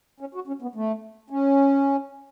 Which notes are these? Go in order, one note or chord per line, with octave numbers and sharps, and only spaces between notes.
C#4
F#4
C#4
B3
A3
C#4